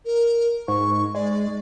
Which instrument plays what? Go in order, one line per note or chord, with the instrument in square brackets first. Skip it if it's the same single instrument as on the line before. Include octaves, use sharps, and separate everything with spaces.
[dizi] A#4
[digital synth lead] G#2 [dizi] C#6
[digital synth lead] G#3 [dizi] D5